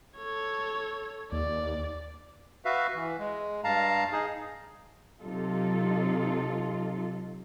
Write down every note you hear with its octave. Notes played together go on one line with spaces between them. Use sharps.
A4 C#5
D#2 D5
F#4 B4 E5 F5
E3
G#3
G2 F5 A5 A#5
D#4 G#4
C3 F#3 D#4 F4 A4